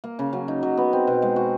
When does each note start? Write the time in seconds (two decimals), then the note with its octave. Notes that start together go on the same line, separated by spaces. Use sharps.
0.04 A#3
0.19 C#3
0.33 F#3
0.48 D#4
0.63 F#3
0.78 B3
0.93 C4
1.07 B2
1.22 G#3
1.36 F#4